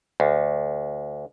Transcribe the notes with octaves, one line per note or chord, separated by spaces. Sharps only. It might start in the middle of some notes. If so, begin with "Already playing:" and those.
D2